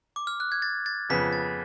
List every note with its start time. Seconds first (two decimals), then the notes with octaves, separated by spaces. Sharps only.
0.16 D6
0.27 F6
0.40 F#6
0.52 G#6
0.62 A6
0.86 A6
1.09 F2 C#3 F3 B3 B6
1.33 A6